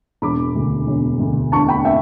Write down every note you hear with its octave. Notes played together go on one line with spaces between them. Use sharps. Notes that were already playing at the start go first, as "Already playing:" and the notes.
E1 B5 D6
D2 D3
E1
D2 D3
E1 A5 C#6
G5 B5
E5 G5